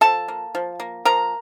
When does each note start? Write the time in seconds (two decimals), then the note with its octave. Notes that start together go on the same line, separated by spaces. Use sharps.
0.01 F3 A4 A5
0.28 A#3
0.55 F3
0.80 A#3
1.05 F3 A#4 A#5